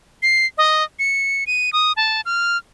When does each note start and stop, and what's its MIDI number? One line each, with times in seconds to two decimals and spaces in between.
0.23 0.46 96
0.58 0.83 75
0.99 1.44 97
1.47 1.73 99
1.73 1.93 87
1.97 2.21 81
2.26 2.57 89